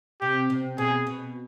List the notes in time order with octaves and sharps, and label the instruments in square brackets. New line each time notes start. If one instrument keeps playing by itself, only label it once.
[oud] C3 [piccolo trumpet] G4
[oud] C3
[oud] B2 [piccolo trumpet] G#4
[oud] B2